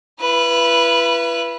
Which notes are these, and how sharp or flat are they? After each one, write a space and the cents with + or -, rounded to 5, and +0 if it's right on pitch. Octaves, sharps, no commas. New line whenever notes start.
E4 +40 B4 -10